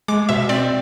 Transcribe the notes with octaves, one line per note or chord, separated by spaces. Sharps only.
G#3 D6
B2 E5
C4 D5